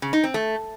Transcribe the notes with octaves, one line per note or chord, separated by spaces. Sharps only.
C#3
D#4
C4
A3